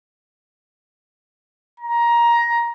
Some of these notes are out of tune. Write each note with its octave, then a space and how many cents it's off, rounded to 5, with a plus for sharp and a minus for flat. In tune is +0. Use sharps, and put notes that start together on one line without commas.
A#5 +15